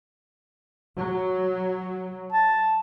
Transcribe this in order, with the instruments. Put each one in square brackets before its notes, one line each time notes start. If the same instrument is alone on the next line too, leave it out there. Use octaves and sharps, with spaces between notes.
[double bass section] F#3
[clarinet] A5